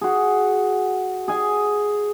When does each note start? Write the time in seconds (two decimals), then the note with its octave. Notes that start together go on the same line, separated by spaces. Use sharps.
0.01 F#4 G#4
1.28 G#4 G#5